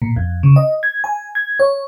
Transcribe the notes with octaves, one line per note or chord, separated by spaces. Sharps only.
A#2
F2
C#3
D#5
G#6
G#5
G#6
C#5